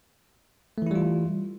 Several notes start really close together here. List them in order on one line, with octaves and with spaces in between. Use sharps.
A3 E3 E4 G3 F4